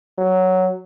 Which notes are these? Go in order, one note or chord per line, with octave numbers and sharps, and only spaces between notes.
F#3